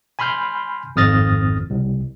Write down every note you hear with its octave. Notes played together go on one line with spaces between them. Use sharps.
G#5 B5 C6 F6 G6
G#1 F2 D#6 F6 A6 A#6
C2